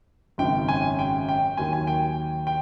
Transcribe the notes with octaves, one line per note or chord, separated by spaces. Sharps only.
G#1 F#2 C#3 G5
G#5
G5
G5
D#2 D#3 F#3 G#5
G#5
G5
G5